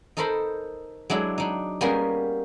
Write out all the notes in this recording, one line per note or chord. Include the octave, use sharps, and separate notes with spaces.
D#4 A4 A#4 C5 A5 B5
F#3 G#3 D4 E4
D4 D#4
G3 A#3 B3 C#4 G#4 A#4